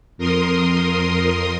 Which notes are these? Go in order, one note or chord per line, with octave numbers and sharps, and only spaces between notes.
F2 A#4 C6 D#6